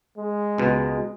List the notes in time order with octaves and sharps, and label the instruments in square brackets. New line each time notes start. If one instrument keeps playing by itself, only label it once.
[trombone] G#3
[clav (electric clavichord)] C#2 B2